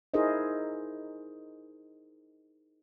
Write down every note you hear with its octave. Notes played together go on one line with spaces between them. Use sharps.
D#4 E4 G#4 A#4 C5 D#5